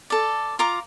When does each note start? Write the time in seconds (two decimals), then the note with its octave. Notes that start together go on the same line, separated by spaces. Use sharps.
0.10 A4 D5
0.59 F4 A#5 D6